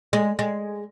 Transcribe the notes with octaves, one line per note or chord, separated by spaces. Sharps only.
G#3
G#3